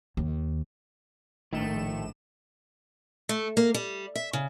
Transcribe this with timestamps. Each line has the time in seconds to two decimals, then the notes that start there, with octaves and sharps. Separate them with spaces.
0.17 D#2
1.53 A#1 A2 D#3 A3 E7
3.29 A3
3.57 A#3
3.74 G3
4.15 E5
4.33 C#3